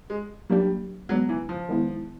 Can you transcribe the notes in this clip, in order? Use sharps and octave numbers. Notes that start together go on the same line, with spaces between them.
G#3
F#3 G3 A#3 D4 G4
F#3 G#3 B3 D4
E3
F3
D#3 G#3 B3 E4